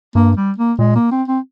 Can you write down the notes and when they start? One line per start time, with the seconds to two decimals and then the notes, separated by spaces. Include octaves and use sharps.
0.15 G2 A#3
0.37 G3
0.58 A#3
0.79 A#2 G#3
0.95 A#3
1.11 C4
1.28 C4